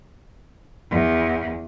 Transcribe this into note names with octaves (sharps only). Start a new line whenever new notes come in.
E2